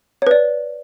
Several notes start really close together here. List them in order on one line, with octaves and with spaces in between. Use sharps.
C#5 B4 D5